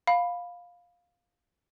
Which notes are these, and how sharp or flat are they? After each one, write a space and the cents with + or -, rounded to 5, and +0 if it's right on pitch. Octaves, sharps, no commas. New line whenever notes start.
F5 +10 B5 +0